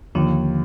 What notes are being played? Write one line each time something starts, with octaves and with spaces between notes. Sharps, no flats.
D#2 D3 F3